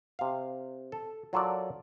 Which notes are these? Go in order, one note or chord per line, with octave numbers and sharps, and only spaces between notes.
C3 F5
A4
F#3 F4 A4 A#4 D5